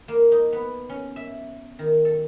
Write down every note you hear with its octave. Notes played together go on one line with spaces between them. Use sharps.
A#3
D#4
B3
C#4
E5
D#3
A4